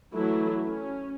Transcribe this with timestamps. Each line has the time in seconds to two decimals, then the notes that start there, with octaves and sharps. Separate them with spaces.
0.13 E3 F#3 A3 E4
0.66 C#4